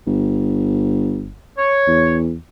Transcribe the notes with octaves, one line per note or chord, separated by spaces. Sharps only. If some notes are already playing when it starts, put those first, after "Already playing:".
G1
C#5
E2